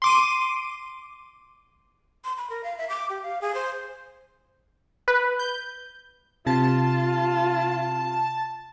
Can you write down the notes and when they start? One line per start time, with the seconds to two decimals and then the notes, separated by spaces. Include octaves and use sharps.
0.02 C6 D6 D#7
2.24 C6
2.37 B5
2.50 A#4
2.64 F5
2.78 E5
2.90 D6
3.10 G4
3.23 F5
3.41 G#4
3.55 C5
5.08 B4
5.39 G6
6.47 C3 F4 A5